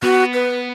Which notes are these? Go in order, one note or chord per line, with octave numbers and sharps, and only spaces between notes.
B3 F#4
B4